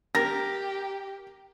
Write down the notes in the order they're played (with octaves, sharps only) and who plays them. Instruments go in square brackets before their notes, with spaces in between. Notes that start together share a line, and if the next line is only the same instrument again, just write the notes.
[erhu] G4 [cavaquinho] A#4 [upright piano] A#6